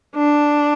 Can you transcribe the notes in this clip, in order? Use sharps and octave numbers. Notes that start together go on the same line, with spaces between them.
D4